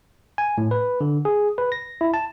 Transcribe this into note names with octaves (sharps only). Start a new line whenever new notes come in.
G#5
A2
B4
D3
G#4
B4
A#6
E4
A5